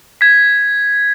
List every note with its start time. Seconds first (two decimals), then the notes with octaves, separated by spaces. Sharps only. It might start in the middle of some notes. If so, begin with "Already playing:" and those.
0.21 G#6 B6